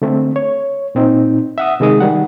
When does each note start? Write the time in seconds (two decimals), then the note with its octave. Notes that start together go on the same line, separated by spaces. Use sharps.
0.02 D3 A3 C4
0.36 C#5
0.95 A#2 C4 D#4
1.58 E5 F#5 D#6
1.80 C3 D#3 G#3 G#4 D#6
2.00 D#3 G3 F#5